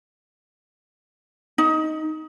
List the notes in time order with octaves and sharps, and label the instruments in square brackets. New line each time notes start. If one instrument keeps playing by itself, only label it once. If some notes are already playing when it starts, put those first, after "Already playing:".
[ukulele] D#4